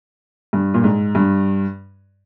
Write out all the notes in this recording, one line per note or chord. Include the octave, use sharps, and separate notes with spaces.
G2
A#2
G#2
G2